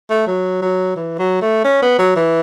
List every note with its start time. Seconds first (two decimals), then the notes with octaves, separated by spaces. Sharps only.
0.10 A3
0.27 F#3
0.62 F#3
0.96 E3
1.19 F#3
1.42 A3
1.65 C#4
1.82 B3
1.99 F#3
2.16 E3